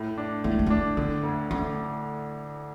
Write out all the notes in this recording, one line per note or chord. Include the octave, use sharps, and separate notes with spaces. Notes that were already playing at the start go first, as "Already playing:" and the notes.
Already playing: A2
D4
A2 B3
A3
G#3
A3 D4
D3 B3
D2
D2 C#4